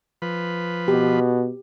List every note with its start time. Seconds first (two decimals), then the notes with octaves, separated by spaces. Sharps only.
0.22 F3 B4
0.88 B2 G4